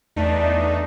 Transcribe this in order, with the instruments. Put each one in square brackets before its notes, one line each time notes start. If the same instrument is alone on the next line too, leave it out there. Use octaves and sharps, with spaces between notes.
[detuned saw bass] E2 [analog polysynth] A3 D4 D#4